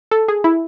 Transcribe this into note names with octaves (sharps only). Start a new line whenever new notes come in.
A4
G#4
E4